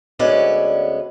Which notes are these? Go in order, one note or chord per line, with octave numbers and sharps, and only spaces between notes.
D2 G#3 B3 C#4 D5